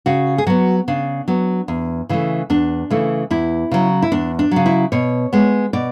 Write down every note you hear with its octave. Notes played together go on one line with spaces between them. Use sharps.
C#3 F#4
G#4
F#3 B3 F#4
C#3 D4
F#3 B3
E2
C#3 E3 A3
E2 D4
C#3 E3 A3
E2 E4
C#3 F#3
E4
E2 D4
D4
C#3 F#3
E4
B2 C#5
G#3 B3
B2 D5